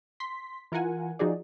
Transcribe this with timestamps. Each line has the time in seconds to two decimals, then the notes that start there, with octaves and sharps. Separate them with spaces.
0.20 C6 B6
0.72 E3 F4 A#4 F#5 G#5
1.19 F3 D#4 F#4 G#4 D5